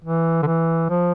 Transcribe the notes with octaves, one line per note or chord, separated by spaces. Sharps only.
E3
D3
E3
F3